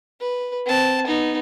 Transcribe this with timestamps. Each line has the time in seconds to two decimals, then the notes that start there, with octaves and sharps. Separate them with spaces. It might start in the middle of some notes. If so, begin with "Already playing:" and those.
0.20 B4
0.66 C4 A5
1.07 B3 D#4